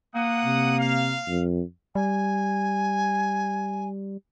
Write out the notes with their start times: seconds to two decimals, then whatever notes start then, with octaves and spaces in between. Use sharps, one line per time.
0.15 A#3 F#5 D#6
0.45 C3
0.79 F5
1.28 F2
1.95 G3 G#5